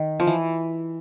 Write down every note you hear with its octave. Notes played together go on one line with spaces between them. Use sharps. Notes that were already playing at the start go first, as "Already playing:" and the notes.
Already playing: D#3
F3
E3